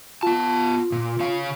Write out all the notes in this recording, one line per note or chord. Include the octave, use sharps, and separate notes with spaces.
B3 F4 A5
A#2
C#3 C#5 F5